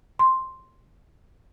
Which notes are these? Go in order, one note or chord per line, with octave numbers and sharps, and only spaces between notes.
C6